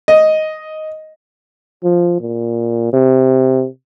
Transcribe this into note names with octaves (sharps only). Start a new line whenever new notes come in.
D#5
F3
A#2
C3